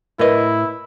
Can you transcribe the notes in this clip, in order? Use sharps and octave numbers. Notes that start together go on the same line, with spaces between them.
A2 E4 A#4 B4 D#5